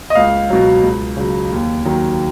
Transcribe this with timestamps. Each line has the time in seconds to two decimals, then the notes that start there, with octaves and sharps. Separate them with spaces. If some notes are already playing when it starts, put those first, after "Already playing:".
0.10 D#5
0.15 C#2 F5
0.50 B2 F#3
0.83 C#2
1.17 C#3 F#3
1.51 D#2
1.85 D#3 F#3